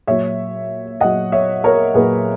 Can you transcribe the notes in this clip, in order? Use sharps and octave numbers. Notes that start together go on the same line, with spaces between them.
A#2 F#3 C#5 E5
A#2 F#3 D#5 F#5
C#5 E5
A#4 C#5
A#2 F#3 G#4 B4